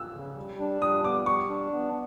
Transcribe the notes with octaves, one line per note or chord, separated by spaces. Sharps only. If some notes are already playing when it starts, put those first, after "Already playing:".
Already playing: E6
C#3
G3
D4
G3 D#6
B3 D6
G3 C#6
D4
B3